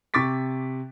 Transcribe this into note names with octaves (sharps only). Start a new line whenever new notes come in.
C3 C#6 D6 A6 B6